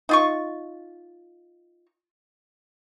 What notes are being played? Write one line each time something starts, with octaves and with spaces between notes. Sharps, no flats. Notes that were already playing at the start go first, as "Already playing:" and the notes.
D#4 F4 C#6